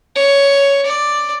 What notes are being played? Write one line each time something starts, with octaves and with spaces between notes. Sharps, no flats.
C#5
D5